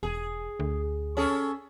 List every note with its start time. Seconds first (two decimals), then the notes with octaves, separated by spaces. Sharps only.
0.03 E1 G#4
0.60 D2
1.17 C#4 G#4 A4